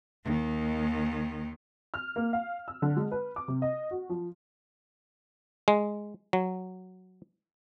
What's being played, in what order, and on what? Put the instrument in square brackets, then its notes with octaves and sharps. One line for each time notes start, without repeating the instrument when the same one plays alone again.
[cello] D#2 D#3
[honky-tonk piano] F6
A#3
F5
E6
D3
G#3
B4
D6
C3
D#5
F#4
F3
[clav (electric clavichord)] G#3
F#3